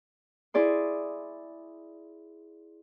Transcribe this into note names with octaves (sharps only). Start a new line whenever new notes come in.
E4 G#4 D5 C6